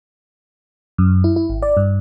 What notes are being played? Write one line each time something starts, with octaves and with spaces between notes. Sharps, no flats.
F#2
E4
E4
G#1
D5
G2